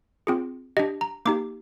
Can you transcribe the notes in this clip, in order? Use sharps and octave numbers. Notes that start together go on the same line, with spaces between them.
C4 F4 G#4
D4 G4 D#5
A#5
A#3 D#4 G4 D6